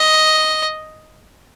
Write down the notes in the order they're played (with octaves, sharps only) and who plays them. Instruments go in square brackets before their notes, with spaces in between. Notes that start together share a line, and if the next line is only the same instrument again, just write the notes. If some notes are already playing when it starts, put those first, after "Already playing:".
Already playing: [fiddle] D#5